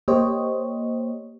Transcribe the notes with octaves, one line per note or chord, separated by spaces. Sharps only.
A#3 G4 C5 C#5 D#5